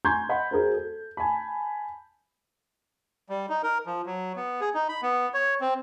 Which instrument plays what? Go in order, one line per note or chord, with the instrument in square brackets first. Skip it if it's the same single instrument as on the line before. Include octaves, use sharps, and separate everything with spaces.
[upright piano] G#5 A#5 C6 C#6 G6 G#6
D#5 F#5 B5 C6
F#4 G#4 A#4 C5
A4
G#5 A5 B5
[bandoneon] G3
D#4
A#4
F3
F#3
B3
G#4
D#4
B5
B3
C#5
C4